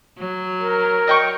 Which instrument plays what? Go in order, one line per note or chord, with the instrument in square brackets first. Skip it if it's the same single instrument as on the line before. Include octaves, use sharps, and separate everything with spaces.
[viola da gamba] F#3
[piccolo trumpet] A#4
[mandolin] D#5 G5 C#6